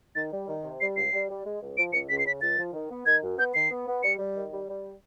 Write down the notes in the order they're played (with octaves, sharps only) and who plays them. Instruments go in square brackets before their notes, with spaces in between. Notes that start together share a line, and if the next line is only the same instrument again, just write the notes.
[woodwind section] D#3 [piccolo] A6
[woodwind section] G3
D#3
C3
[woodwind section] G3 [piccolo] C7
[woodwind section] C#2 [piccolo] C7
[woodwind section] G3
G3
G#3
C#2
[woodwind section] F3 [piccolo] D7
[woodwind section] C#2 [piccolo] C#7
[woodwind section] C#2 [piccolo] B6
[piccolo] C7
[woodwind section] C#3 [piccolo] B6
[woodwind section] C#2 [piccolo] A6
[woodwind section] F3
D#3
B3
[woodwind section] D#3 [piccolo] G#6
[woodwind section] F#2
[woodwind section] B3 [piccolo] G6
[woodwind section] D#3 [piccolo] C7
[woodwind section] B3
B3
[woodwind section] G3 [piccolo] C#7
[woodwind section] G3
D#3
G3
G3